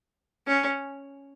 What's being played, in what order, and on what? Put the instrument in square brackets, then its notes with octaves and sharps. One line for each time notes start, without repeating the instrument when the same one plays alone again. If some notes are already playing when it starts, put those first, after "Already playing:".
[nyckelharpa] C#4